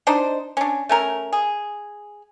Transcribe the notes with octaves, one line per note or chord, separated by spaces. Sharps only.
D4 D#4 C5
C#4 D4
A3 C#4 A#4
G#4